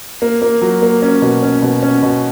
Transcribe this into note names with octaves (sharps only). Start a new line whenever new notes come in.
A#3
A#3
F#3
A#3
C#4
B2
C#4
B2
C#4
B2